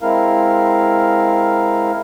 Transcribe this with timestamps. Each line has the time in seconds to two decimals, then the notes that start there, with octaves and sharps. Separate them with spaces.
0.01 G#3 C4 E4 A#4 F5